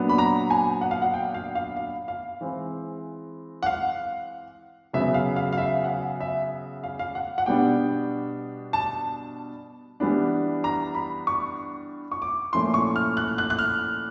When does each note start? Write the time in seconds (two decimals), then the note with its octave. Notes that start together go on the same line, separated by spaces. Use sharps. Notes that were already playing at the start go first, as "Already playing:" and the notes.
Already playing: A#2 F#3 B3 D4
0.09 B5
0.18 A#5
0.50 G#5
0.81 F#5
0.91 F5
1.02 F#5
1.14 G5
1.34 F5
1.55 F5
1.77 F5
2.08 F5
2.41 E3 G#3 C4
3.63 F#5
3.66 F5
4.93 C#3 F#3 B3 E5
5.14 F5
5.36 F5
5.53 F5
5.57 E5
5.84 F#5
5.89 F5
6.20 E5
6.84 F5
6.99 F5
7.15 F#5
7.38 F#5
7.46 B2 G3 B3 D4 G5
8.73 A5
10.00 E3 G3 B3 D4
10.64 A#5
10.95 B5
11.27 C#6
12.12 C#6
12.22 D6
12.53 A#2 F3 A3 C#4 E4 C6
12.74 C#6
12.96 F6
13.17 F#6
13.38 F#6
13.50 F#6
13.59 F6